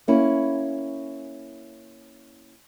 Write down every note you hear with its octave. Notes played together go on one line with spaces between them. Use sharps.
A#3 C#4 E4